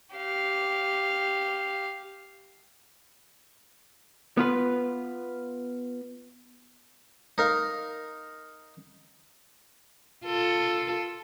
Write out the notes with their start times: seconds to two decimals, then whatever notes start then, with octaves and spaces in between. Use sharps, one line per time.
0.16 G4 F5
4.37 B3 F4 B4
7.38 D#4 A#4 F5
10.25 F4 A4